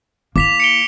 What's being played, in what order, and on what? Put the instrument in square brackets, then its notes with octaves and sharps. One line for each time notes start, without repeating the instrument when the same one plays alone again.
[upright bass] A#3 E4 [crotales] D6 B6 F7
[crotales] C#7 D7 G7